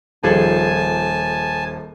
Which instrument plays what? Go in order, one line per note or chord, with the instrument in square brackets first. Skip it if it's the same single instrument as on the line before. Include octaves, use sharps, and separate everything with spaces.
[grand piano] D#1 F3 [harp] G#4 A4 [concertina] G#5 A5